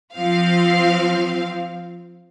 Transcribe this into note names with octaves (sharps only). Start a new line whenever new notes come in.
F3 C4 F5